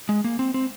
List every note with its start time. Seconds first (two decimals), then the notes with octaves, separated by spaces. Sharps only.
0.09 G#3
0.24 A#3
0.39 C4
0.54 C4